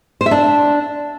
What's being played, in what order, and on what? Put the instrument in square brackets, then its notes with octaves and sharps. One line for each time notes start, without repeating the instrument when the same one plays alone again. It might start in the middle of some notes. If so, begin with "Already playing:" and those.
[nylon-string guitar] C5
E5
D4